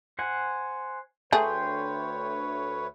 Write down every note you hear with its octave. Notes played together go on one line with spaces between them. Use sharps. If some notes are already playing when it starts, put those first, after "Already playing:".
C5 F#5 G#5
D2 A3 G#4 B4 C#5 G5 C6